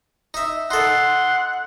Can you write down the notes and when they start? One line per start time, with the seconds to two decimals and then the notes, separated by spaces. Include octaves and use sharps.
0.34 D#4 E5
0.71 D#4 A4 F#5 C6